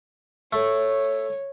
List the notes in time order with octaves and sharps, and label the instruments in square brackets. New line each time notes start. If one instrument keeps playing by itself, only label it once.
[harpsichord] A3 [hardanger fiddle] C#5